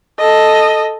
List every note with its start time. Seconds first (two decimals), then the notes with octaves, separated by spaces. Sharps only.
0.19 A4 D#5